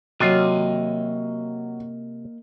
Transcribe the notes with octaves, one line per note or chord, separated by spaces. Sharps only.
C3 F#3 A#3 F4 F#4 C#5 D#5 D#7